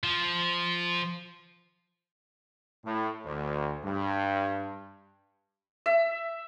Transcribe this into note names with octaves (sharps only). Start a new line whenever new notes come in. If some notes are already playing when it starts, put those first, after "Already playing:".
F3
A2
D2
G2
E5